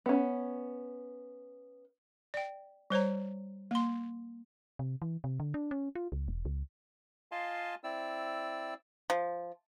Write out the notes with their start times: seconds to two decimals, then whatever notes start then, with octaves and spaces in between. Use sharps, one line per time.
0.06 B3 C#4
2.34 D5 G5
2.90 G3 C5 C#5 A#5
3.71 A#3 C6
4.79 C3
5.02 E3
5.24 C3
5.40 D3
5.54 D4
5.71 C#4
5.95 F4
6.12 C#2
6.28 E1
6.45 C#2
7.32 F4 D#5 F5 G#5 A5 C6
7.84 C4 E4 D5 E6
9.10 F3